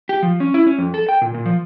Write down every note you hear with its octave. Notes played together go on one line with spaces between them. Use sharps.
G4
F3
C#4
E4
C#4
F2
A4
G5
A#2
A#2
F3